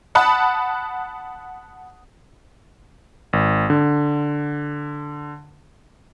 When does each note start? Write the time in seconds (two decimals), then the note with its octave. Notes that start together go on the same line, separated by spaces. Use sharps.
0.15 F#5 A5 B5 D#6 F#6
3.33 G#1
3.70 D3